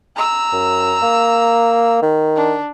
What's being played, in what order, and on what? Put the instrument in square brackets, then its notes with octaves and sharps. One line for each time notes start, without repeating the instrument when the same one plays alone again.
[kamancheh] A#5 E6
[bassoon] F#2
A#3
D#3
[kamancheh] D4